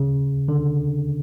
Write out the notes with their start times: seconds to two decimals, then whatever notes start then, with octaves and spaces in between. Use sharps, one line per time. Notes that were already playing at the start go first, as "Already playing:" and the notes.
Already playing: C#3
0.48 D3